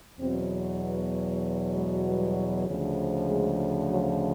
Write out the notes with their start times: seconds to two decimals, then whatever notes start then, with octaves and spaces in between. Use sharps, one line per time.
0.19 E2 B2 F#3 C4
0.81 B3
1.74 G#3
2.04 G3
2.66 D2 C#3 F3
3.28 G#3
3.90 F#3